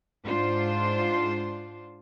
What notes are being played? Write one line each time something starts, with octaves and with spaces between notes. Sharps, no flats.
G#2 D4 F4 C5